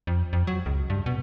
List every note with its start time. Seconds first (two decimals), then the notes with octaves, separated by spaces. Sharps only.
0.07 F2
0.33 F2
0.47 F#3
0.66 C#2
0.90 G2
1.06 B2